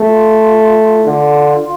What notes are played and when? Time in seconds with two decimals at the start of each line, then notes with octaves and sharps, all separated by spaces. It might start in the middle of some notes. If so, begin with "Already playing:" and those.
Already playing: A3
0.08 F4
1.03 D3 F4